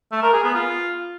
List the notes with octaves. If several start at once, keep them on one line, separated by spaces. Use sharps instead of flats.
A3
A#4
G#4
B3
F4